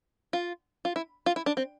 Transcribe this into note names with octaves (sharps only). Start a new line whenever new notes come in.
F4
F4
E4
F4
E4
D4
C4